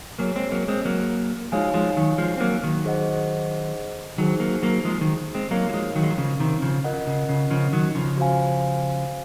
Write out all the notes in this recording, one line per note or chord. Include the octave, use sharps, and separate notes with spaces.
F#3 A#3 G#4 C#5 G#5
G#3 C4
F#3 A#3
G#3 C4
F#3 A#3
F3 G#3 D#4 F#4 C#5 F5 G#5
F3 G#3
D#3 F#3
F3 G#3
C4
F#3 A#3
D#3 F#3
G#4 C5 D#5 F#5
D#3 F#3 D#4 G#4 C5
F#3 A#3
F#3 A#3
F3 G#3
D#3 F#3
G#3 C4
F#3 A#3 D#4 F#4 A#4 C#5 F5
F#3
F3 G#3
D#3 F#3
G#3
F#3
C#3 F3
C3 D#3
C#3 F3
F4 A#4 D#5 F#5
C#3
C#3
C#3 F3
D#3 F#3
C#3 F3
F#4 C5 F5 G#5